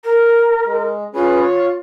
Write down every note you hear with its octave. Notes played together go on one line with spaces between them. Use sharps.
A#4
G#3
C#4 F4 G#4 B4
C#5